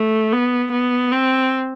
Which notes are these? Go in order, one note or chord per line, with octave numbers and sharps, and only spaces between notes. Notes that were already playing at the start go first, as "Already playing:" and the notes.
Already playing: A3
B3
B3
C4